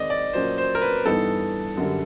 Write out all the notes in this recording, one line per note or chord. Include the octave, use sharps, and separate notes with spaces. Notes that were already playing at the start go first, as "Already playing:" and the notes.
Already playing: D#3 G#3 C4 D5 D#5
D5
A#2 F#3 A#3 C#4 C5
C5
A#4
B4
G2 E3 G3 B3 D#4 A4
F#2 D3 G3